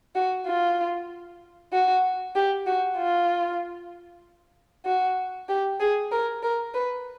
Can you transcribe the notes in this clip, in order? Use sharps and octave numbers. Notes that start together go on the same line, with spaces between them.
F#4
F4
F#4
G4
F#4
F4
F#4
G4
G#4
A#4
A#4
B4